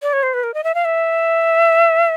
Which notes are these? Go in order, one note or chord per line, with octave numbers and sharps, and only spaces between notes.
D5
C#5
C5
B4
A#4
D#5
E5
F5
E5